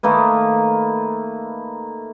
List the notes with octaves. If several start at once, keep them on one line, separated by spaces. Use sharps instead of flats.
D#3 A3 A#3 B4